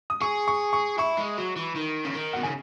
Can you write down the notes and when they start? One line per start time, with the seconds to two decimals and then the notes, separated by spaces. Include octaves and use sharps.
0.10 D#6
0.21 G#4 C#6
0.48 C#6
0.73 C#6
0.98 E4 C#6
1.17 G#3
1.37 F#3
1.56 E3
1.75 D#3
2.05 C#3
2.14 D#3
2.33 B2 F#5
2.43 C#3 G#5